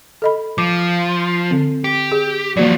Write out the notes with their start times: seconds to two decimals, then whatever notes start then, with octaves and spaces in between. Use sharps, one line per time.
0.22 A4 D#5 B5
0.58 F3 D6
1.51 D3 C4
1.84 G4
2.12 G#4
2.57 F3 F#3 A#3 F#4 D5